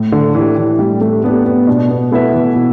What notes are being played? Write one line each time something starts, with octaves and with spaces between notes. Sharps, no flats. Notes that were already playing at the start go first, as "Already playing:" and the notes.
Already playing: A2
D3
E3 A3 D4 G4
E3
A2 G3
A3
A3 B3 D4 G4
B3
B2 D4
B3
A3 B3 E4 B4 E5
E3
B2